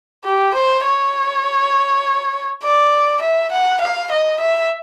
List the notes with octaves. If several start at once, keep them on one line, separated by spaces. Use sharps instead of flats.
G4
C5
C#5
D5
E5
F#5
F5
D#5
E5